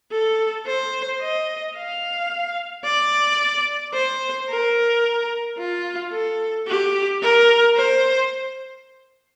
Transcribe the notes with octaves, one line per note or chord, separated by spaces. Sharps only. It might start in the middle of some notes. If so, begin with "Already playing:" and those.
A4
C5
D#5
F5
D5
C5
A#4
F4
A4
G4
A#4
C5